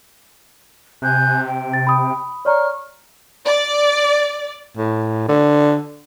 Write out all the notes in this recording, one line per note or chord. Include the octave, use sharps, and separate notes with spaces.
C3 G#5 F#6 G6
G5
A6
B5 D#6
C#5 D5 A#5 C#6 F6
D5
A2
D3